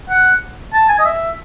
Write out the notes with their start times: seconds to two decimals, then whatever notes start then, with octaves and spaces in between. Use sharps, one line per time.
0.10 F#5
0.74 A5
0.89 G#5
0.99 D#5
1.05 E5